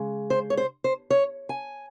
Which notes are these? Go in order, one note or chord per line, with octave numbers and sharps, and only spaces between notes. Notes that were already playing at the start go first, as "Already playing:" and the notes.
Already playing: C#3 G#3
C5
C#5
C5
C5
C#5
G#5